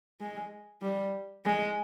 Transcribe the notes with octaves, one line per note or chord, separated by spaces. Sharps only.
G#3
G3
G#3